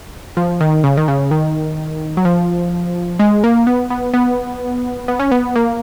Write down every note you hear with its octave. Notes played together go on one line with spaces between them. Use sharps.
F3
D#3
C#3
D#3
C#3
D#3
F#3
F3
G#3
A#3
B3
B3
B3
B3
C#4
B3
A#3